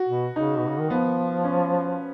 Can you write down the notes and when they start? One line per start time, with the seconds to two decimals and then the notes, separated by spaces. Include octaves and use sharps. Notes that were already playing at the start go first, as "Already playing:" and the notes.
Already playing: F#4
0.08 B2
0.36 C#3 D#4
0.58 B2
0.69 C#3
0.79 D#3
0.90 F3 B3
1.44 C#4